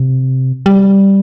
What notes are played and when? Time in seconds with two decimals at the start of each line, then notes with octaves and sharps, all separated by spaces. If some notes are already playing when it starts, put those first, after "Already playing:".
Already playing: C3
0.66 G3